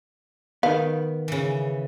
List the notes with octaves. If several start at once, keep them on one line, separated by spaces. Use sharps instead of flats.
D#3 B3 F5
C#3 E3